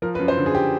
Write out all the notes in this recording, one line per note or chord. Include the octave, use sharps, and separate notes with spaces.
F3 A#4
B4
F#2
C5
D3
G#4
G4